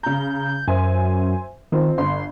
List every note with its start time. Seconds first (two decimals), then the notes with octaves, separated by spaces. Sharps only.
0.03 C#3 A#5 G6
0.68 F#2 C5 E5 G#5
1.72 D#3 F3 C4
1.98 G1 C6